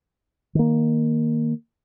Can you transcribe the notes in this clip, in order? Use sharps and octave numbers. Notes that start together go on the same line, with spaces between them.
D#3 A#3